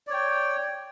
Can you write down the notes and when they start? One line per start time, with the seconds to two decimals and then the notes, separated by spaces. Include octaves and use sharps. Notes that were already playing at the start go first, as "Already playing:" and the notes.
0.07 D5
0.10 C#5
0.13 G5